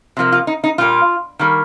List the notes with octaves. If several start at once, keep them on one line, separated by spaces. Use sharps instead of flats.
C3 F3 A#3
F4
D#4
D#4
A#2 G3 A#3 F4
D#3 G3 A#3